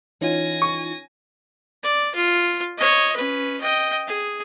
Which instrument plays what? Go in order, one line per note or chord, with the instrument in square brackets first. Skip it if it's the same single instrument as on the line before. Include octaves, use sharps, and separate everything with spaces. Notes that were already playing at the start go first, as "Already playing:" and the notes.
[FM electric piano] E3 D#4 F4 [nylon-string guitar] C#4 [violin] G#5 A#6
[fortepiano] C#6
[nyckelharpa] D5
F4
C#5 D#5
C#4 B4
D#5 G5
G#4